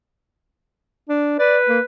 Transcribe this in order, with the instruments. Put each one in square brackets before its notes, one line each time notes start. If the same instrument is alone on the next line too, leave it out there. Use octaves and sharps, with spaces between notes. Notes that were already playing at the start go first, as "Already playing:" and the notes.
[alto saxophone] D4
[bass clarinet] B4 [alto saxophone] D5
[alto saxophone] A#3